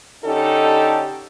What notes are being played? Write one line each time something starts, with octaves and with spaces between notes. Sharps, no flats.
D3 C#4 D#4 G4 A4